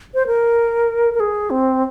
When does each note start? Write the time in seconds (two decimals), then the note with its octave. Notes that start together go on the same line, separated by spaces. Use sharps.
0.14 C5
0.27 A#4
1.14 A#4
1.20 G#4
1.50 C4